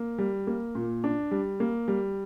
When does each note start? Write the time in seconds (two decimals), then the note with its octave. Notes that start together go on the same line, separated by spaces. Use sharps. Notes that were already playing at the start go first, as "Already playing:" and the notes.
Already playing: A#3
0.18 G3
0.47 A#3
0.75 A#2
1.04 D4
1.31 G3
1.60 A#3
1.88 G3